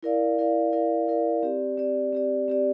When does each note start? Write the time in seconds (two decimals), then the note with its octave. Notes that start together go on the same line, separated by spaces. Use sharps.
0.03 E4 A#4 D5 F5
0.38 E4 A#4 D5 F5
0.72 E4 A#4 D5 F5
1.08 E4 A#4 D5 F5
1.43 C4 G4 D5
1.78 C4 G4 D5
2.13 C4 G4 D5
2.48 C4 G4 D5